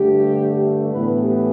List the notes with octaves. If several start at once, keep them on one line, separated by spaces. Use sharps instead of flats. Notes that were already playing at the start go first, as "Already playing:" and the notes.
Already playing: G2 D3 A3 G4
A2 E3 B3 B4
G4